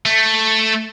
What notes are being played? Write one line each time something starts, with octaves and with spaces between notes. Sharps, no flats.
A3